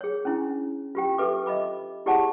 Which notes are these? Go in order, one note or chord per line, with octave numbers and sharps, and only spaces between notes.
G#4 C#5
C#4 D4 E4
F4 G4 G5
G4 A4 B4 E5 D6
D#5 E5 B5 D6
E4 G4 G#4 D5 F#5 A5